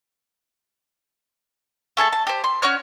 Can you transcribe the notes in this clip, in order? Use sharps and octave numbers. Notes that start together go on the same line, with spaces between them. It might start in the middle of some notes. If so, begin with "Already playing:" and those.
A3 G#4 A4 A5
A5
G4 C5
C6
C#4 F#4 C#5 F6